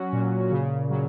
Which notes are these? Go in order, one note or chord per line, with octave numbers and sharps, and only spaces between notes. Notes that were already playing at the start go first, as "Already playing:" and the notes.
Already playing: F#3 C#4 F#4
A#2
C#3
F#3